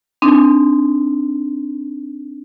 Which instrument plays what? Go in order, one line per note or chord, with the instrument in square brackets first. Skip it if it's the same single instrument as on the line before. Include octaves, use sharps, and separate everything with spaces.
[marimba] C4 D4 D#4